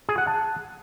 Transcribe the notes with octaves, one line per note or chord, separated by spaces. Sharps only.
G#4
F#5
A5